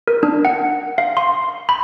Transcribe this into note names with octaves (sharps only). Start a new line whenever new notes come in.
A#4
D4
F#5
F5
C6
B5